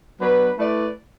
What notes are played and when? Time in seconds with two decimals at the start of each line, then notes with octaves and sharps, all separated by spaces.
0.20 F#3 B3 D4 B4
0.58 A3 E4 B4 D5